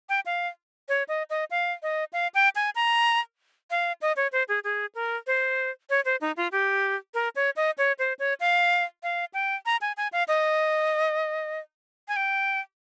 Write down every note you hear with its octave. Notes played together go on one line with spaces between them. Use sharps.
G5
F5
C#5
D#5
D#5
F5
D#5
F5
G5
G#5
A#5
F5
D#5
C#5
C5
G#4
G#4
A#4
C5
C#5
C5
D#4
F4
G4
A#4
C#5
D#5
C#5
C5
C#5
F5
F5
G5
A#5
G#5
G#5
F5
D#5
G#5
G5